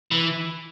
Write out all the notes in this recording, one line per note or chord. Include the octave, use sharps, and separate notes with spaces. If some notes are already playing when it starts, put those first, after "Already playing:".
E3